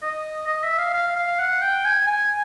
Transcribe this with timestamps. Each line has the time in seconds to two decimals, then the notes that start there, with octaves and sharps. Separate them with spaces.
0.02 D#5
0.47 D#5
0.63 E5
0.78 F5
0.93 F5
1.16 F5
1.39 F#5
1.62 G5
1.85 G#5
2.07 G#5